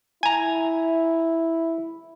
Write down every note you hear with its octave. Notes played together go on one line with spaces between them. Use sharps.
E4 G#5 A#5